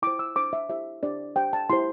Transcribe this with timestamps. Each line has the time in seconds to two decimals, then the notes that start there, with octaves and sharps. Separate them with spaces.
0.02 E4 C5 D6
0.19 E6
0.36 D4 C5 D6
0.53 E5
0.69 E4 G4 C5 E5
1.03 D4 G4 C5 D5
1.36 D4 G4 C5 G5
1.53 A5
1.70 E4 G4 C5 C6